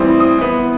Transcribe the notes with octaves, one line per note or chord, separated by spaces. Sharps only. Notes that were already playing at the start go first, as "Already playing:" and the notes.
Already playing: A2 E3 G3 C4 D#6
D#6
E3 B3